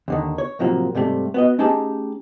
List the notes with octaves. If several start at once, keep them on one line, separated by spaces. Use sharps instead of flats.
D#2 D3 D#3
C#5
A2 C3 F3 F#3 A#3
G#2 C3 G3 A3
B3 F#4 D#5
A3 C#4 D#4 G4 G#4 A5